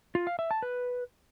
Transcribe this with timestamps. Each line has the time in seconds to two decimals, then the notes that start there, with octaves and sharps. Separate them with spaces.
0.15 F4
0.27 F5
0.39 E5
0.51 A5
0.62 B4